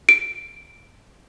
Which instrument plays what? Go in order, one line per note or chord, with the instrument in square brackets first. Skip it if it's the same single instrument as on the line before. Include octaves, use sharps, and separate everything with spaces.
[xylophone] D7